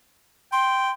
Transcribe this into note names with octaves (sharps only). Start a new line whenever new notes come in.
G5 C6